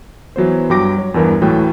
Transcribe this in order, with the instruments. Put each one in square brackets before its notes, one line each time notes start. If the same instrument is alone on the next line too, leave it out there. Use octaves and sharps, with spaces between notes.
[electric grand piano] E3 F#3 B3 C5
G2 F#3 G5 D6 A#6 D7
C#5
E2 G2 E3 A#4
D2 A2 E3 F#3 A3 G5